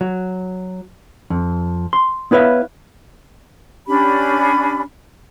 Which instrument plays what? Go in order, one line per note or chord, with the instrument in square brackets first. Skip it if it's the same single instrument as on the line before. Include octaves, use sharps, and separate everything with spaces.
[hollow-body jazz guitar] F#3
F2
C6
B3 E4 B4 C#5 E5 F5
[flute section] C#4 D4 G4 B5